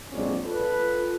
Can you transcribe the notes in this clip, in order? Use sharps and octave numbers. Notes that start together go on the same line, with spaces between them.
A#1 F2 F#3 G#3 C#4 D5
F4 A4 B4